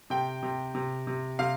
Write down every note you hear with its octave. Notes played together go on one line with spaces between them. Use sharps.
C3 G5
C3
C3
C3
C3 F5